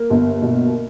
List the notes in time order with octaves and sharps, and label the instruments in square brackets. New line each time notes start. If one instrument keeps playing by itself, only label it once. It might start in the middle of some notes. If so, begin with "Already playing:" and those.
Already playing: [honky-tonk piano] A#3 A#4
G1
B2